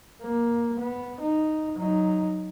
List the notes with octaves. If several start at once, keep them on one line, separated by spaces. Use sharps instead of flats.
A#3
B3
D#4
F#3 D#4